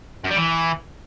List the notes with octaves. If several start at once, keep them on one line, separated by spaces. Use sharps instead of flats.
F#2
G3
E3